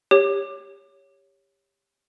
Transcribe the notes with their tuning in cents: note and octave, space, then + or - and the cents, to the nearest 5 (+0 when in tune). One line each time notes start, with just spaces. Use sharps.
G4 +20 C#5 +0